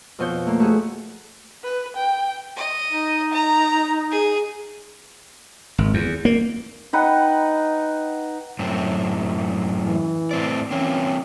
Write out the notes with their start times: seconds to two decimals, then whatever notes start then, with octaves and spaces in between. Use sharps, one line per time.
0.19 F2 B2 F4 C#5 G6
0.47 A3 A#3
0.60 A3 F#4 G#4
1.64 B4
1.97 G5
2.56 D#5
2.90 D#4
3.33 A#5
4.11 G#4
5.78 G#1
5.94 E2
6.25 A#3
6.93 D#4 B4 F#5 G5
8.59 F#2 A2 C4
9.86 E3
10.31 A2 C4 D5
10.71 E3 A#3 C4 C#4